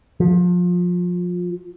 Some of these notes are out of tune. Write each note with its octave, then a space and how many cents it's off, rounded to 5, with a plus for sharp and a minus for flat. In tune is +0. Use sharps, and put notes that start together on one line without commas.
F3 +25